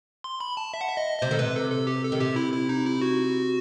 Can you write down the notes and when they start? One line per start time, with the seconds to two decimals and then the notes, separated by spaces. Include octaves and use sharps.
0.24 C6
0.40 B5
0.57 A5
0.74 E5
0.81 F#5
0.88 E5
0.97 D#5
1.19 D#5
1.22 C3 C5
1.31 D#3 A4
1.39 C3 B4
1.55 A4
1.71 A4
1.87 G4
2.04 A4
2.12 D#3
2.20 C3 G4
2.36 E4
2.53 E4
2.69 D#4
2.85 E4
3.02 F#4